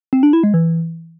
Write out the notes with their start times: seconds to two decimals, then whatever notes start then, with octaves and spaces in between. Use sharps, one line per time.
0.13 C4
0.23 D4
0.33 E4
0.44 G#3
0.54 E3